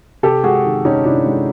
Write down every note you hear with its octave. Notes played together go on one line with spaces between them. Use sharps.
C3 G4 A4
G#3 F#4 G#4
D#3
C3 C#4 D#4
C3 D4 E4
G#3